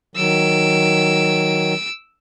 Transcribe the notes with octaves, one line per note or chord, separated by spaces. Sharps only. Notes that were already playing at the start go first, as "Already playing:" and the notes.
D#3 F#3 E6 D7